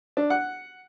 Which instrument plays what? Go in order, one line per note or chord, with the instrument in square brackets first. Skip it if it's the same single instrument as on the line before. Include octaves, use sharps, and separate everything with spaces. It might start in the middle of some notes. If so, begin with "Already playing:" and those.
[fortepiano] D4
F#5